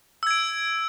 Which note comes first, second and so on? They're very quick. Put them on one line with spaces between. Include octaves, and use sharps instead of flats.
E6 G#6 D7